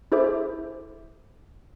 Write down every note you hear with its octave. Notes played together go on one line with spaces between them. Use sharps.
E4 G#4 A4 C5 E5 D6